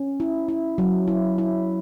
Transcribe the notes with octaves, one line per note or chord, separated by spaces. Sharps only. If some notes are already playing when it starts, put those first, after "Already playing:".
Already playing: C#4
E4
E4
F#3
E4
E4